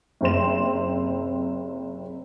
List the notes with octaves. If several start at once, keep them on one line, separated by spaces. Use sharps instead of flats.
F#1 C3 C4 C5 C6 E7